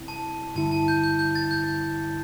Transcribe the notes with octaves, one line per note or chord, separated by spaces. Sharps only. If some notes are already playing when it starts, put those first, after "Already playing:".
Already playing: C3 G3 C4 E4
A5
G2 D3 G3 E4 A5
A5
G6
G6
G6
A6
G6